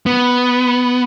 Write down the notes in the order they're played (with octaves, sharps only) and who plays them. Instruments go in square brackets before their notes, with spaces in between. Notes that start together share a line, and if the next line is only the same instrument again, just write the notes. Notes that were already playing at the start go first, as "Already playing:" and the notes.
[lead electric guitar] B3